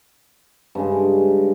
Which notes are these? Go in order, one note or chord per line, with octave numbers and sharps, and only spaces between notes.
G2 C#3 G#3